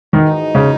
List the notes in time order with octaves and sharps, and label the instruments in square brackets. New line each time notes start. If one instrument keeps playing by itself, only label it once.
[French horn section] G#2 E3 G#3 D#4 F#4 [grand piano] D#3
[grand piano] C#3